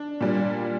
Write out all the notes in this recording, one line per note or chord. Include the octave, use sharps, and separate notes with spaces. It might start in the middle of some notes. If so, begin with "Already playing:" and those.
Already playing: D4
A#2 G3